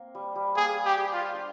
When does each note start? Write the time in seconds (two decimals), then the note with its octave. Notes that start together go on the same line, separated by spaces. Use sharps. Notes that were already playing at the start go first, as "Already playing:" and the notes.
Already playing: A#3 C4
0.15 G3
0.35 G3
0.56 A#3 G#4
0.86 G4
1.13 F4
1.34 D4